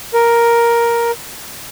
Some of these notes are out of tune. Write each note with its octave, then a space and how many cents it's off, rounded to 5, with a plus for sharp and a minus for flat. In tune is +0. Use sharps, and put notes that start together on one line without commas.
A#4 +5